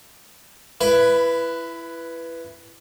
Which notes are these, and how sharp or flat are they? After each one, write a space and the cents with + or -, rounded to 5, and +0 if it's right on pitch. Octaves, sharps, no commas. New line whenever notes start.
E4 +20 B4 +0